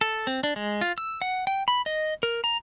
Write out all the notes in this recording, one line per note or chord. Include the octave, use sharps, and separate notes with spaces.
A4
C4
D4
G#3
F4
E6
F#5
G5
B5
D#5
A#4
A#5